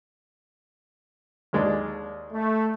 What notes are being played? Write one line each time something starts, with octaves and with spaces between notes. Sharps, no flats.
D#2 G#3 D4
A3